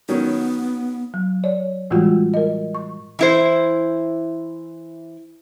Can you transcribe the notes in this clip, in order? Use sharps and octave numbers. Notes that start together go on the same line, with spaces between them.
D#3 F#3 B3 C#4
F#3
C#5 D5
A2 E3 G3 G#3 F4 F#4
A#4 D#5
C#6
E3 E4 C5